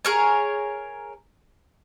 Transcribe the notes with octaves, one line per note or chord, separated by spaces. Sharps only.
G#4 A#4 C#5